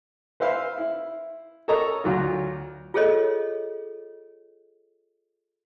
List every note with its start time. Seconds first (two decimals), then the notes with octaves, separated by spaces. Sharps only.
0.40 B4 C5 E5 F5 B5 C6
0.78 E4
1.68 A4 A#4 C#5 D#5 A#5
2.04 D2 F#3 F4
2.94 F4 G#4 A4 C#5 D#5